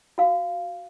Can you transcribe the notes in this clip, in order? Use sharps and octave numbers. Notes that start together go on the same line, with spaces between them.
F#4 F5